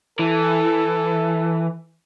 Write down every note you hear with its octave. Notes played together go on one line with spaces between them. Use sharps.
E3 A4